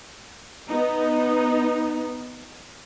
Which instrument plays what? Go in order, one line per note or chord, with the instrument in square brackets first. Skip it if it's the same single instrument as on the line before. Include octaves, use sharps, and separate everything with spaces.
[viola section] B3 D#4